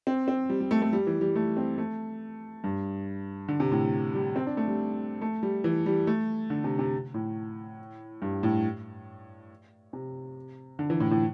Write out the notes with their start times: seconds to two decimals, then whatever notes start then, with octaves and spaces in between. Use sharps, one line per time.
0.07 C4
0.28 C4
0.50 G3
0.60 G3
0.71 A3
0.82 A3
0.93 G3
1.07 E3
1.21 G3
1.35 A3
1.57 C4
1.78 A3
2.64 G2
3.48 D3
3.60 C3
3.72 A2
4.14 G3
4.36 C4
4.47 D4
4.57 A3
4.68 G3
5.21 A3
5.43 G3
5.64 E3
5.86 G3
6.07 A3
6.50 D3
6.64 C3
6.79 C3
7.14 A2
8.22 G2
8.43 A2
9.93 C3
10.79 D3
10.90 E3
11.00 A2
11.11 A2